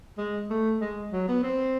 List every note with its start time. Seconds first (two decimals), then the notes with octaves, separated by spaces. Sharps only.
0.18 G#3
0.50 A3
0.81 G#3
1.12 F#3
1.28 B3
1.43 C4